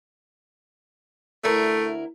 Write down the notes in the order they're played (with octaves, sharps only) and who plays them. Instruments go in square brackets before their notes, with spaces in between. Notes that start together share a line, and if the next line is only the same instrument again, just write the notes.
[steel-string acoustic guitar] D2 E4 A#4 [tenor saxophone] A3